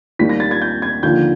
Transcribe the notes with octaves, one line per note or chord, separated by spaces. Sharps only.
D#2 D#3 G3 B6
A#6
A6
G#6
G6
G#6
D#2 D3 F3 G6